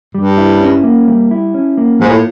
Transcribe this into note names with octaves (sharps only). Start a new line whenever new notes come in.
G2 G3
E4
C#4
A#3
G3
E4
C#4
A#3
G#2 F3
A2